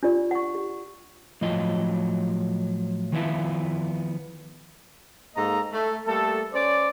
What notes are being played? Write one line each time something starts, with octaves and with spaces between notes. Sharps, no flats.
D4 F4 G4 D5
F#5 C#6
G4
A2 F3 F#3 F4 D#5
D#3 F3 B3 E4 E5 F5
G#2 A#3 A4 D#5 A#5
A3
G3 A3 A#3 A4
C#4 C5 D5